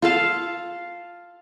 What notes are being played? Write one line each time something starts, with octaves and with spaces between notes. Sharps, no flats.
F4 A4 F5 A5